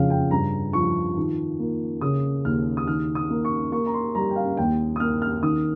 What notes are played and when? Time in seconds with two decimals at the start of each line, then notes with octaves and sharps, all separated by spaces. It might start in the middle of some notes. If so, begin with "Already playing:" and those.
Already playing: F2 C#3 F5 G5
0.10 G5
0.31 G2 A#5
0.73 F3 C#6
1.17 D#3
1.60 A#3
2.01 C#3 D#6
2.45 D#2 F6
2.77 D#6
2.87 D#3 F6
3.15 D#6
3.30 A#3
3.45 C#6
3.72 A#3 C#6
3.86 A#5
3.94 C6
4.15 G3 A#5
4.30 G5
4.36 F5
4.57 D#2 G5
4.96 D#6
5.00 A#3 F6
5.22 F6
5.42 D#3 D#6